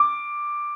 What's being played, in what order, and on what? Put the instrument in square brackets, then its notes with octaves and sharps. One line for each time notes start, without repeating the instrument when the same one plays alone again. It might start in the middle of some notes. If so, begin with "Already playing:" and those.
Already playing: [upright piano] D6